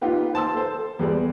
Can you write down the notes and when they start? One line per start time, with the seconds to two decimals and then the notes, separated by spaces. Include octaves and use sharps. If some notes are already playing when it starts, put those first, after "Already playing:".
0.01 D#4 F4 G4 B4
0.33 C5 A5 C6 E6
0.55 A4 C5
0.99 E2 G3 G#3 D5